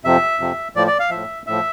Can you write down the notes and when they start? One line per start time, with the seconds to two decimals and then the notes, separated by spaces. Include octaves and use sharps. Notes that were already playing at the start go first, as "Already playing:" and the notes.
0.05 F2 C3 F3 E5
0.40 F2 C3 F3
0.75 A2 F3 D5
0.87 D5
1.00 F5
1.10 A2 F3 E5
1.47 A2 F3 E5